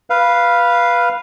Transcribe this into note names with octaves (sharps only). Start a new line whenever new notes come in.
B4 F5